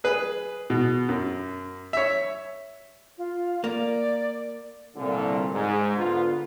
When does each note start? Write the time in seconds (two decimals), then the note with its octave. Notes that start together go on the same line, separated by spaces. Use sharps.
0.04 G#4 B4
0.70 B2
1.09 F#2
1.93 C#5 E5
3.18 F4
3.64 A#3 D5
4.96 C2 A#2 D3
5.52 G#2
5.96 D3 B3 F4